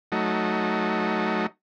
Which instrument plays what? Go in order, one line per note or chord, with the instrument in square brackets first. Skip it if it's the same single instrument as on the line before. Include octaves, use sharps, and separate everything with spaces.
[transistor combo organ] F#3 A3 D#4